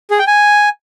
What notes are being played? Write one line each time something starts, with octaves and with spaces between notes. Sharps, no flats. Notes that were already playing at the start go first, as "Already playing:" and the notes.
G#4
G5
G#5